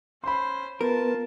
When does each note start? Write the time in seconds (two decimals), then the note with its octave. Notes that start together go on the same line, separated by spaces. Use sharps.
0.24 C#4 C5 B5 C6
0.81 B3 F4 A#4 B4 A5